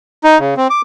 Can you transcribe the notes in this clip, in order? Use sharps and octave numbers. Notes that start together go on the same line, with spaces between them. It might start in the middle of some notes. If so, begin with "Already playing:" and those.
D#4
C#3
C4
D6